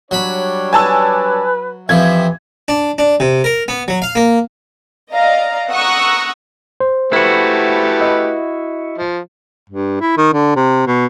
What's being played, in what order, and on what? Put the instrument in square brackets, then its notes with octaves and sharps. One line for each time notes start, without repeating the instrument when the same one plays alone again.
[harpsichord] F#3 B5 [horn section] G3 D4 C#5
[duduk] B4 [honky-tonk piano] G#5 A5 E6
[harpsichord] F2 F3 [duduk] E3 [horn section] G4 D#5 E5 [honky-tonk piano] G#6
[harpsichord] D4
D4
C3
A#4
B3
F#3
F5
A#3
[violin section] D5 D#5 F5 A#5
F#5 A#5 C#6 D#6 E6 F#6
[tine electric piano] C5
[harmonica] A3 G4 B4 [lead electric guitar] E4 F#4
[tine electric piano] D#5 E5
[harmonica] F3
[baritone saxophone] G2
E4
D#3
D3
C3
B2